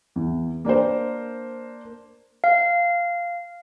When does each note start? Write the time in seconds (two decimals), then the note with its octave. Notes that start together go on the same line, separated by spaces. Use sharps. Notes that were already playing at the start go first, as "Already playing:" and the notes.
0.16 E2
0.65 A#3 D4 A#4 C5
2.44 F5